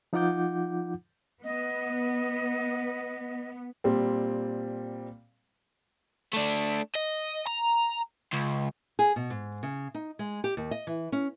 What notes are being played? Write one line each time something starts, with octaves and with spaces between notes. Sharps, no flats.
F3 D#4 F4 F#5 D6 G6
B3 D#5
A#2 G3 C4
A3 D4
D#5
A#5
C#2
G#4
B2
G#2
C#3
D#4
G#3
G4
D#2
D#5
E3
C#4